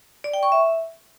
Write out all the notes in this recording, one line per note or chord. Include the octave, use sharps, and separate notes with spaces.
D5
G5
C#6
E5